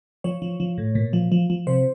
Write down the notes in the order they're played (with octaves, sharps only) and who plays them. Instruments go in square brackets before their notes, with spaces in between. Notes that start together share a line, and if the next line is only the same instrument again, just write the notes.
[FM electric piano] F3 C#5
F3
F3
A2
A#2
F3
F3
F3
C3 C5